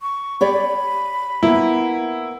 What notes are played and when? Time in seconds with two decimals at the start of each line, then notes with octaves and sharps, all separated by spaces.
0.02 C#6
0.41 G4 C#5 D5 B5
1.43 A#3 B3 E4